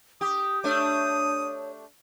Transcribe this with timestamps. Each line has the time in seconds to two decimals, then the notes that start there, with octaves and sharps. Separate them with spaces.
0.21 G4 D#6
0.64 A3 D4 C#5 D#6